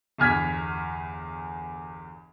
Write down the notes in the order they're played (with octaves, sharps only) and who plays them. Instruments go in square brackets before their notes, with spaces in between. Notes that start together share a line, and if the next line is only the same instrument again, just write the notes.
[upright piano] G1 E2 G#5 F6 G#6 B6